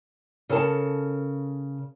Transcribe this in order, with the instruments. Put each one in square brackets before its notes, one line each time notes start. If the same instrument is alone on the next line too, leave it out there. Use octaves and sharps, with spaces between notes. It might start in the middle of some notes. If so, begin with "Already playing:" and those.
[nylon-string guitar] C#3 A4 A#4 A5